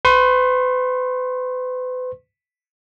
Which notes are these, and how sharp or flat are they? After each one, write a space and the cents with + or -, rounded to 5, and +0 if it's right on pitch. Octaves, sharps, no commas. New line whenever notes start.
B4 +40 C6 +45